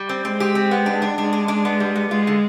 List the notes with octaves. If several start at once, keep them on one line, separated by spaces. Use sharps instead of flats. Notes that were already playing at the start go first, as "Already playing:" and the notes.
Already playing: G3
C4
G#3 C4
G4
C4
B3
D4
D4
G#3 D4
D4
D4
B3
G3
B3
G#3 F4
D3